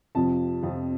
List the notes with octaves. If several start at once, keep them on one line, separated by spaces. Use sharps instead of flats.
F2 C3 F3 A5
F2 C3 F3